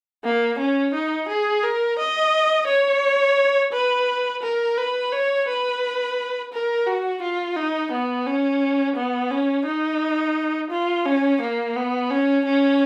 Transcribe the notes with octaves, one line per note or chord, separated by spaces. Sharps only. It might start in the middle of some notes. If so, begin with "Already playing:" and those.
A#3
C#4
D#4
G#4
A#4
D#5
C#5
B4
A#4
B4
C#5
B4
A#4
F#4
F4
D#4
B3
C#4
B3
C#4
D#4
F4
C#4
A#3
B3
C#4
C#4